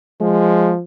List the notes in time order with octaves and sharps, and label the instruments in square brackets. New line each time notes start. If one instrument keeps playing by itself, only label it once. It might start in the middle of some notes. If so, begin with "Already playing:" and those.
[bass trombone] F3 [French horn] G#3